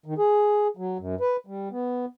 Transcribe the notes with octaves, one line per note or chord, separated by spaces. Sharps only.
D#3
G#4
F#3
F#2
B4
G3
B3